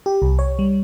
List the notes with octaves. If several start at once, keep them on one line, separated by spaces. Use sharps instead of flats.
G4
C2
C#5
G3